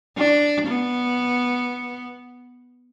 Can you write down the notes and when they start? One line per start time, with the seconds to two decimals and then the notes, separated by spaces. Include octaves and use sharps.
0.17 D4
0.67 B3